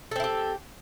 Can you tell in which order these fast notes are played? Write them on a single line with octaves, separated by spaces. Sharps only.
A4 C4 E4 G4